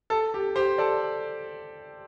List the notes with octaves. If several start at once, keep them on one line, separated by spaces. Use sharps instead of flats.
A4
G4
G4 C5
A4 D5